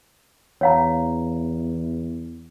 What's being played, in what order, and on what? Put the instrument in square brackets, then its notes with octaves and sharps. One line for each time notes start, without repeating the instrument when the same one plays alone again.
[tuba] E2 [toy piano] C#5 F5 A#5